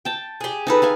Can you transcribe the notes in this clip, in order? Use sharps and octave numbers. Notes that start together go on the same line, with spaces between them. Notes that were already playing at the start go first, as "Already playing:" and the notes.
G5 A5
G4 G#4
D#4 A4 B4
B4 F5 G#5